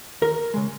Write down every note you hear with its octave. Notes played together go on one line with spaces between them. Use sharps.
D#2 A#4
C#3 G#3